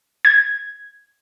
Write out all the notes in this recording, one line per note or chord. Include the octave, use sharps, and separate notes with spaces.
G#6